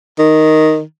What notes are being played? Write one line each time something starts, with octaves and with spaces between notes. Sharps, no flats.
D#3